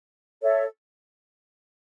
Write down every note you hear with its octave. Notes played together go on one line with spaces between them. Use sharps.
A4 C#5 E5